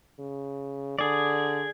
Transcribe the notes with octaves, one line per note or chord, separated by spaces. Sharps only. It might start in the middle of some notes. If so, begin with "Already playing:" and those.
C#3
D3 G#4 D5